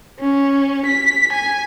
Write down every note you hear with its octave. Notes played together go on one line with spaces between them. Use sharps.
C#4
B6
G#5